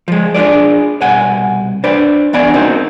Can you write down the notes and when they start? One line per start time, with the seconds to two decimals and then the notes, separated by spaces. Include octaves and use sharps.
0.08 F3 G#3
0.34 D4 F4 G#4 D5
1.01 C2 B2 F#5 G#5
1.84 D4 B4 C5 D5
2.33 E2 C3 B3 D4 D5 G#5
2.54 A#3 C4 C#4 D#4 F#4 C5